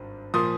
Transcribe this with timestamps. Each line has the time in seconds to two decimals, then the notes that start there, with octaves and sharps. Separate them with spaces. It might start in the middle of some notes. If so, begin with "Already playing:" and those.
Already playing: G#1 G2
0.34 A#2 F3 C6 D#6